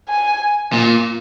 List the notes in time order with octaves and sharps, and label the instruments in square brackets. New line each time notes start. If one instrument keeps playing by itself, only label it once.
[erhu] G#5
[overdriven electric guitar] A#2